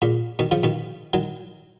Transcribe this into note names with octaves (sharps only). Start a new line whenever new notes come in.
A#2 C#3
B2 D#3
C#3 F3
B2 D#3
D#3 F#3